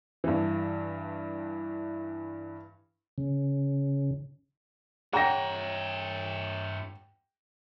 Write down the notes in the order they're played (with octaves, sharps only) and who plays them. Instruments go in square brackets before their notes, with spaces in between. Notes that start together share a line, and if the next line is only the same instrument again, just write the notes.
[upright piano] G2 E3
[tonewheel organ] C#3
[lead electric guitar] G2 C#5 [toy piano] G#4 A#5 [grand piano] F#5 G5 A#6